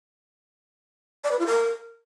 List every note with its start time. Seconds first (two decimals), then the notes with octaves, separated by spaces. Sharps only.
1.24 D5
1.31 B4
1.39 F4
1.46 A#4